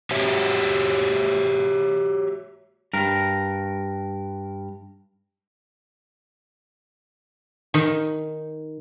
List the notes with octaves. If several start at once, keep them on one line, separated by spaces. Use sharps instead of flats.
F#4 G4 C#5 E5
G2 A#4
D#3